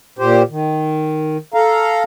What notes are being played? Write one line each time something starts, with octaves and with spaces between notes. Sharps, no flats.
A#2 G4 C5
D#3
A4 F5 A#5